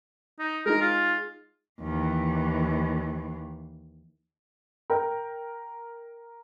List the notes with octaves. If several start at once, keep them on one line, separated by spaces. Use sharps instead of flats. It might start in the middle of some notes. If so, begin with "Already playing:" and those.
D#4
G#3 D#4 A#4
F4
D#2 E3
A#4 G5